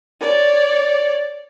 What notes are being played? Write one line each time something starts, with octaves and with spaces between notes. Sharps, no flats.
C#5 D5